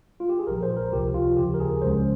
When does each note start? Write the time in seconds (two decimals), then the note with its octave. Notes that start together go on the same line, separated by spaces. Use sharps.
0.20 F4
0.29 G4
0.39 G#4
0.47 A#1 A#2 F3 A#4
0.63 C5
0.77 A#4
0.92 C#2 C3 F3 G4
1.14 F4
1.37 D#2 C#3 F3 G4
1.54 A#4
1.60 G#4
1.82 C#2 C#3 G#3 C#4 C5